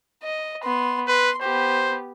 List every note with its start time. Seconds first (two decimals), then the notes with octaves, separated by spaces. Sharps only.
0.23 D#5
0.64 B3 C6
1.07 B4 C6
1.42 B3 G4 C5